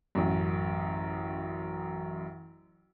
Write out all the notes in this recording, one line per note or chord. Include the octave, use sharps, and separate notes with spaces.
A1 F#2